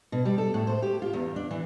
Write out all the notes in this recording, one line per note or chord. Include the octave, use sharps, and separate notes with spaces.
B2
G3
A4
A2
C5
G4
F4
E2
D4
E3